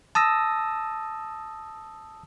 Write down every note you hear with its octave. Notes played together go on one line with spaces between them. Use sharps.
A5 D#6 E6 A#6